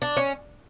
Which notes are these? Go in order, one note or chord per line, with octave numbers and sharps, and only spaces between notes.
D4
C#4